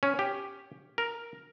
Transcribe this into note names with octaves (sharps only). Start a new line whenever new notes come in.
C#4
G4
A#4